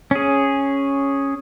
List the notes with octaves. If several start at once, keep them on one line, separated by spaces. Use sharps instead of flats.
C#4 G#4